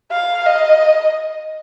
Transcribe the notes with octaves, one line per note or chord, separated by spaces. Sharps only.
F5
D#5